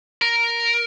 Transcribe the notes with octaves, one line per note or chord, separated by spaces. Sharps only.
A#4